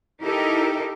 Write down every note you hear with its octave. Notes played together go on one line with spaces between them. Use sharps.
D#4 E4 G4 A4 A#4